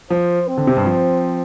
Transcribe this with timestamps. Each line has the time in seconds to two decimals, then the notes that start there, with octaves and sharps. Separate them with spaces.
0.10 F3 C5
0.48 C4
0.57 D3
0.67 C3
0.77 G2
0.86 F3